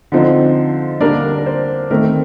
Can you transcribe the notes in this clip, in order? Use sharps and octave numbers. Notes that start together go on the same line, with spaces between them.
D3 F3 C4 D#4
D3 G3 A#3 D4 A#4 D5
A#4
C5
D#3 A3 C4 A#4